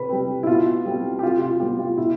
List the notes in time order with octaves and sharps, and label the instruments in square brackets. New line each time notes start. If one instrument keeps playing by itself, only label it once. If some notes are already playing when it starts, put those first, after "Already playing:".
Already playing: [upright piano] C3 B4
G3 C4
E4
B2 F4
G3 C4
G4
C3 F4
F4
G3 B3 G4
F4
B2 E4